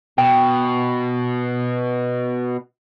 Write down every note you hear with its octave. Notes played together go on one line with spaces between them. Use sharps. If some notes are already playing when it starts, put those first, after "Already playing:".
B2 G5